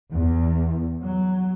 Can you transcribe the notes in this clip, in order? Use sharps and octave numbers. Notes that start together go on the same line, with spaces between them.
E2
F#3